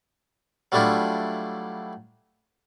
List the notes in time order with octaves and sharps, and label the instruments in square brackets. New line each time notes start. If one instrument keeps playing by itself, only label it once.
[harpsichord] F#3 G3 A3 D4 E4 F4